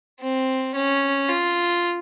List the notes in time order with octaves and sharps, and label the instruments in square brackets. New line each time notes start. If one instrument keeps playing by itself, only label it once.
[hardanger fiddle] C4
C#4
F4